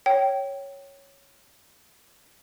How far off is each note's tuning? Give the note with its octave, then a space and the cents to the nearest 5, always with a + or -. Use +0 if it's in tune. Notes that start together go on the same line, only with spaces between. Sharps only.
C#5 +0 G5 -15